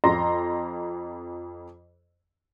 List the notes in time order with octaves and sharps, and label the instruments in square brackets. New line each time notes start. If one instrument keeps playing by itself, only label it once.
[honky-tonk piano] F2 A#5 C6 A#6